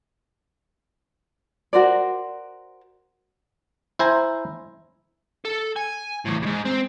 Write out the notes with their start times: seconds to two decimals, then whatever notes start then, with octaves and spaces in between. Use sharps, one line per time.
1.73 F#4 A#4 C5 D5
3.99 E4 C5 G#5 A#5
5.45 A4
5.76 G#5
6.25 E2 A2
6.42 E2 G#2
6.65 C4